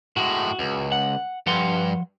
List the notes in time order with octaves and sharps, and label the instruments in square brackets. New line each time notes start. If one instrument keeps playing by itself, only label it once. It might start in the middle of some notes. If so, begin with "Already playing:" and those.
[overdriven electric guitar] A2 G#3 [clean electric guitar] F#4
[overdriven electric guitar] C#2
[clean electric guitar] F#5
[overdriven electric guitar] G2 [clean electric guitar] F3 F#5 C6